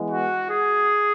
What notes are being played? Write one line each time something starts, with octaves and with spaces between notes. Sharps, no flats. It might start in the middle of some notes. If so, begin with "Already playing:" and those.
Already playing: E3 G#3 B3
F#4
G#4